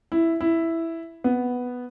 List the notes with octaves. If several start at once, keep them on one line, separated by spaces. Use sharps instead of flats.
E4
E4
B3